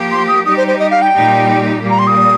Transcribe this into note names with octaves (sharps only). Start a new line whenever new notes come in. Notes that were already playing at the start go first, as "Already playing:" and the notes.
Already playing: F3 A#3 G4
C6
D#6
G3 D#4 G4 D#6
C5
C5
D#5
F5
G5
A#2 G3 D#4 G4
A#2 G3 A#3
A#5
C6
D#6